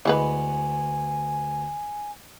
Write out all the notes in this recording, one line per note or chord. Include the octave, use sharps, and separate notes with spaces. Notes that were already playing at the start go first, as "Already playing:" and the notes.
D2 E3 G#3 B3 B4 G#5